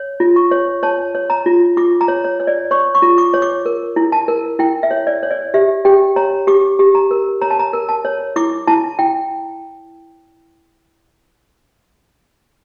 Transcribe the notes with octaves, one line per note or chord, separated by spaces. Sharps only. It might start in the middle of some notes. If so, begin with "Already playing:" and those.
Already playing: C#5
F4
C#6
C#5
C#5 A5
C#5
A#5
F4
F4 D6
A#5
C#5
C#5
C#5
D5
C#5 C#6
C#6
F4
D6
C#5
D6
A#4
E4
A5
A#4
E4 G5
E5
C#5
D5
C#5
D5
G4 E5
G4 G5
C#5 A#5
G4 D6
G4
A#5
A#4
C#5 A#5
A5
A#5
A#4
A5
C#5
E4 D6
E4 A5
E4 G5